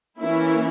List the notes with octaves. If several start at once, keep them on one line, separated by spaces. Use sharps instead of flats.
E3 A#3 C#4 E4